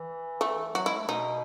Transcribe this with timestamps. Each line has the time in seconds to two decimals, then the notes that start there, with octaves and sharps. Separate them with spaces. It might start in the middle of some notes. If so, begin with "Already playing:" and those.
Already playing: E3
0.41 A3
0.75 F#3 F#4
0.86 G#3 E4
0.97 A3
1.08 B2 D#4